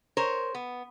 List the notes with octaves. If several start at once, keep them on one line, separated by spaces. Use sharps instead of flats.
A#4 C5 C#5
B3